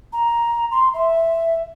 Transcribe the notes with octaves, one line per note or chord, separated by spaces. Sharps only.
A#5
C6
E5